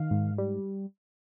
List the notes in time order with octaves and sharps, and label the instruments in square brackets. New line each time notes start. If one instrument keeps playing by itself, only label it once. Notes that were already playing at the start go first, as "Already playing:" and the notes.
Already playing: [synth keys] D#3 F5
G#2
G3